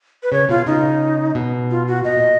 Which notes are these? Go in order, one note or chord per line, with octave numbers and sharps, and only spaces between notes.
B4
C#3 C#5
B2 F4
C#3 D#4
B2
F4
F#4
B2 D#5
A#2